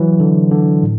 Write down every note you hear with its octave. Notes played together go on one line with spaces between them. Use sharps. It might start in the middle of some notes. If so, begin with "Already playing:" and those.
Already playing: E3 F#3
D3
D3
A2